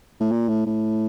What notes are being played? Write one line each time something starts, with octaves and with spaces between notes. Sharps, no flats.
A2
A#2
A2
A2